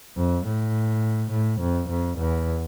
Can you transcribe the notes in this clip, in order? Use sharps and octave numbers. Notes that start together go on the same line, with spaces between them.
F2
A2
A2
F2
F2
E2